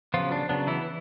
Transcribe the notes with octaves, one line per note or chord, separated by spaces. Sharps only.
C#3 F3 F#3 B3 F4
D4
C#3 F#3 B3 D4
E3 E4